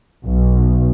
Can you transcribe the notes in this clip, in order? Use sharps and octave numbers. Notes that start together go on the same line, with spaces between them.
B1